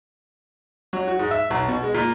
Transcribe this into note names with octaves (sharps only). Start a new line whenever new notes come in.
F#3
F#4
G#2
E5
B1
B2
G#3
A#2